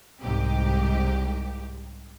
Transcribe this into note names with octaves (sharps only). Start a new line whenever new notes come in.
C2 G#2 G4